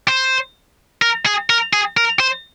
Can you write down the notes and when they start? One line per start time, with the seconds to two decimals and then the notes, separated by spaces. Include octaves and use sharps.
0.08 C5
1.02 A#4
1.26 G#4
1.50 A#4
1.73 G#4
1.97 A#4
2.20 C5